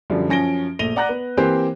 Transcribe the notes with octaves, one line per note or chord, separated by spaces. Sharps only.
F#2 D3 F3 G3
F#2 F3 C#4 A#6 D7 G7
A#1 A3 A#6 D#7 F7 G7
D5 F#5 A#5 F#6 A#6
B3
E3 A#3 C4 G4 C5